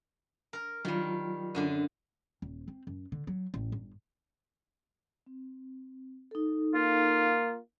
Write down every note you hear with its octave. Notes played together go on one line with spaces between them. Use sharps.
A#4
D#3 F#3 G3 F4
F#2 D3 D4
D#1
C4
F#2
D3
F#3
A1
G1
C4
D#4 A4
A#3 F4